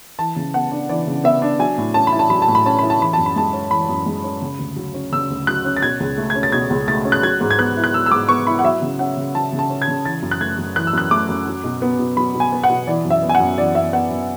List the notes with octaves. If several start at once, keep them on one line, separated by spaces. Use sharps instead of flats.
E3 A5
C#3
B3 F#5
D4
E3 D5
C#3
B3 E5
D4
F#3 G#5
A2
C#4 A5
B5
E4
A5
F#3 B5
A5
A2
B5
C#4 A5
E4 B5
A5
E3 B5
F#2 A5
B5
G#3 A5
C#4
E3 B5
F#2
G#3
C#4
C#3
D2
F#3
C#4
C#3 E6
D2
F#3 F#6
C#4
A6
B2 G#6
C#2
A3
G#6
C#4
A6
B2 G#6
C#2
A3 A6
C#4
F#6
F#3 G#6
G#2
G#6
B3 F#6
E4
F#6
F#3 E6
E6
G#2 D6
B3 C#6
E4 B5
F#5
F#3 E5
C#3
C#4 F#5
C#3
F#3 A5
C#3
A5
C#4
G#6
C#3
E3 A6
F#2
F#6
A3 G#6
F#2
E3 F#6
E6
F#2 F#6
A3 D6
F#2
F#3
B2
B3
B2
F#3 B5
B2
G#5
B3
F#5
B2
E3 D5
F#2
E5
B3
G#5
F#5
F#2
E3 D5
F#2 E5
B3 F#5
F#2